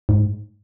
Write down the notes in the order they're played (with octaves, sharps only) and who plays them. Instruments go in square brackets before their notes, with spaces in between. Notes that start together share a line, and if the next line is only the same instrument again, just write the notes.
[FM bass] G#2